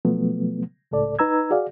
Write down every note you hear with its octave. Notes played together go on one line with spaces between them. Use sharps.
B2 F3 F#3 A3 B3
C#2 A2 A4 D5
D#4 B4 A#5 E6 G#6
F#4 G#4 D5 F5